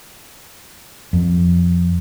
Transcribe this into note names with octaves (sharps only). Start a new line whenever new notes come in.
F2